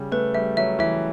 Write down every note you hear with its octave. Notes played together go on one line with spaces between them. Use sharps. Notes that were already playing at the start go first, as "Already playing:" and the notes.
Already playing: C#3 G3
A3 B4
G3 E5
F#3 E5
E3 E5